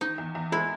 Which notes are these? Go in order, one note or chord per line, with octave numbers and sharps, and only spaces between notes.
D#3 D#4
E2
E2
G#3 E4